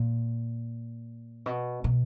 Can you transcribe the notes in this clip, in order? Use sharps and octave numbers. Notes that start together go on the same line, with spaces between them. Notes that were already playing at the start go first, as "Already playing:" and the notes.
Already playing: A#2
B2
B2